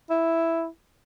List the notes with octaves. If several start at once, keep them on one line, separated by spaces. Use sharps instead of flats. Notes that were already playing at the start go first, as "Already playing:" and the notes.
E4